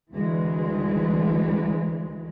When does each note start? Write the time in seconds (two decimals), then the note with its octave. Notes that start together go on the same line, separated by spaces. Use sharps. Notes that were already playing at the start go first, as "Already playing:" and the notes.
0.12 D2 E3 G#3